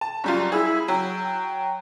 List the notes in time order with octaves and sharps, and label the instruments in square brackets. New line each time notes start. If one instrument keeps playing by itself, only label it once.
[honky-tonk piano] A5
F#2 G3 F4
[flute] E4 [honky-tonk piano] G#4 E6
[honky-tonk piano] F#3 [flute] G5